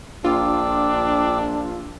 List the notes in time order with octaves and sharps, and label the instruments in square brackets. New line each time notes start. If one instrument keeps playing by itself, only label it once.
[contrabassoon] A#1 [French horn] D4 [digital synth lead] F4 [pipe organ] G5 D6 E6